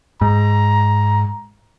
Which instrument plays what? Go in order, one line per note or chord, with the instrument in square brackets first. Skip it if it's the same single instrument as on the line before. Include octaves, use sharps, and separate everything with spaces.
[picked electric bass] G#2 [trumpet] A#5